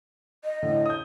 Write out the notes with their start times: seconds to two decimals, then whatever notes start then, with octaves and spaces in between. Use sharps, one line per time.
0.45 D#5
0.62 A2 D3
0.86 D#6 G6